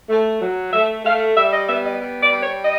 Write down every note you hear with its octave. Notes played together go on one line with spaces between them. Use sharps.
A3
F#3
A3 E5
A3 F5
G3 E5
D#5
B3 E5
D#5
G3
D5
G3
C#5
D#5